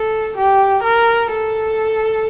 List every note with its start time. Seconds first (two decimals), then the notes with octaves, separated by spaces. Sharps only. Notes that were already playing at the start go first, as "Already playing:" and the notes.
Already playing: A4
0.37 G4
0.83 A#4
1.30 A4